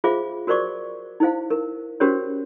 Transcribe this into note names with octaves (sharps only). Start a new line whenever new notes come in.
F4 G#4 C5 E5 F5 D6
F#4 A#4 C5 D5 C#6 D6
D#4 E4 C5 F5
A#4
C#4 F#4 G4 A#4 C5 C#5